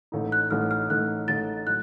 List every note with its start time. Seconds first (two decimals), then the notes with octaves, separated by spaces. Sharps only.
0.12 A1 A2 A3 D#4
0.32 F#6
0.51 A1 A2 A3 D#4 F6
0.71 F6
0.89 A1 A2 A3 D#4 F#6
1.28 A1 A2 A3 D#4 A6
1.67 A2 F#3 F#6